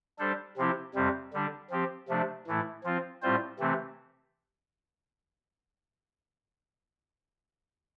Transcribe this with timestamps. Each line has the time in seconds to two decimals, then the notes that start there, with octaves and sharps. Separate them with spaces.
0.19 G3 D4 A4 C5
0.57 C3 F3 C4 E4 G4
0.94 F2 C3 G3 C4
1.33 D3 G3 D4
1.70 F3 C4 G4
2.09 C3 F3 A3 D4
2.47 A2 E3 A3 E4
2.84 F3 C4 F4
3.22 A2 G3 C4 F4 C5
3.60 C3 E3 A3 C4